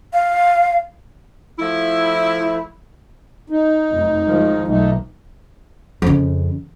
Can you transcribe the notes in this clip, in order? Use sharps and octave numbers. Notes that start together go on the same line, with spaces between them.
F5
F3 A3 E4
D#4
F1 F#2
D#3 F3 G#3
B1 A3 D#4
F2 C#3